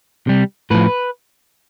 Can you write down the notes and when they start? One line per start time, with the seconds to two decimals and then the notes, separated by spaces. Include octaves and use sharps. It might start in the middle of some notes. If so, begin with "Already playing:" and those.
0.27 C3 G3
0.71 A2 F3 B4